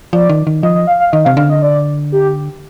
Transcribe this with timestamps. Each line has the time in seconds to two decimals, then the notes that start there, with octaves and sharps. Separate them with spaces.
0.13 F3 D5
0.29 D#3
0.47 D#3
0.62 F3 D#5
0.75 D#5
0.87 F5
1.00 F5
1.13 D#3 D#5
1.25 C3 F5
1.37 D3 F5
1.50 D#5
1.62 D5
2.12 G4